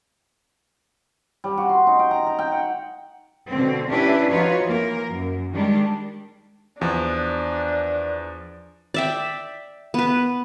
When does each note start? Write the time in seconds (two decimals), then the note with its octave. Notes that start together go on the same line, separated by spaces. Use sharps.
1.44 G3
1.58 F#4
1.69 C6
1.87 D#4
1.99 G5
2.11 A#5
2.27 A#5
2.39 G5
2.52 F#5
3.49 B2 D3 C4
3.89 C#4 D4 E4 G4 B4
4.30 F3 D#4 F4 F#4 B4 C#5
4.64 E3 A#3 A#4
5.10 F#2
5.53 D#3 G3 G#3 D4
6.81 E2 F3 D4
8.94 D5 E5 G5
9.94 B3 B4